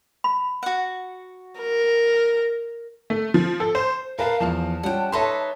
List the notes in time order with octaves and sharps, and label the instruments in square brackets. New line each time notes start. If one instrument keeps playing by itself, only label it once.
[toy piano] B5
[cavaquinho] F#4 F#5
[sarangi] A#4
[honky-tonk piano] A3
F3
A4
C5
[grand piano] A#4 B4 A5 [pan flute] F5
[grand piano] E2 F3 F5 [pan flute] A5
[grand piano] G3 C#4 F4 [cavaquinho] F#5 G5
[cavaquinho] D#4 A4 B4 [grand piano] C#5 E5 C6